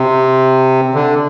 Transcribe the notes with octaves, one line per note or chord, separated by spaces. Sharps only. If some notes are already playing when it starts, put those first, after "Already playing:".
Already playing: C3
D3